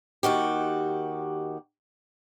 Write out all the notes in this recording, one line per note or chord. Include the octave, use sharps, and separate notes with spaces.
D#2 D#3 F#4 G4